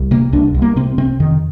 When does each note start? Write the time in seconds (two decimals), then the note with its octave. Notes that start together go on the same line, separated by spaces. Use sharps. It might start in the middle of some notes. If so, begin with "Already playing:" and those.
Already playing: C2
0.11 C3 A#3
0.33 C2 D4
0.54 C2
0.62 A#3
0.76 C3 C4
0.98 C3 C4
1.20 F2 D#3